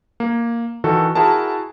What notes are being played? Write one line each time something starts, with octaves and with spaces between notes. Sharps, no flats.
A#3
D#3 E3 F#4 A4
E4 F#4 G#4 A#4 A5